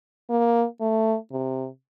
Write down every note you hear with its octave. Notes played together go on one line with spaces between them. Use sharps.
A#3
A3
C3